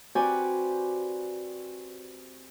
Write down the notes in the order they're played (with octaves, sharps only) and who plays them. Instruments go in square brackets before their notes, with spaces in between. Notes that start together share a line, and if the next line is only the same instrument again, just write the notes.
[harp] C4 F#4 G4 B4 D5 G#5